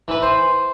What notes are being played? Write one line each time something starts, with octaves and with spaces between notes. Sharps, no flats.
E3 B4
C5